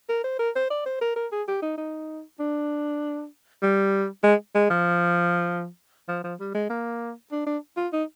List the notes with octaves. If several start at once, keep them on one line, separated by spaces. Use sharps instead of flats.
A#4
C5
A#4
C5
D5
C5
A#4
A#4
G#4
G4
D#4
D#4
D4
G3
G#3
G#3
F3
F3
F3
G3
G#3
A#3
D4
D4
F4
D#4